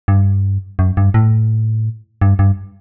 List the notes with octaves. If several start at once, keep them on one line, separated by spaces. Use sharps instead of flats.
G2
F#2
G2
A2
G2
G2